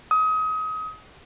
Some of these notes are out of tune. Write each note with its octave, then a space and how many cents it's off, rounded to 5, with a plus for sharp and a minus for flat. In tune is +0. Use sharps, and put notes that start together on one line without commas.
D#6 +30